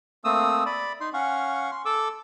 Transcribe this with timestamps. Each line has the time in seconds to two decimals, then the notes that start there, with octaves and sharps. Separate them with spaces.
0.25 A3 A#3 C4 D#6 E6
0.66 D5 B5
1.00 D#4 C6
1.13 C#4 F5 F#5 C#6
1.71 C6
1.85 A4 D6 E6